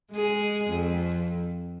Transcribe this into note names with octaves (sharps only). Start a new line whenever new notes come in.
G#3 G#4
F2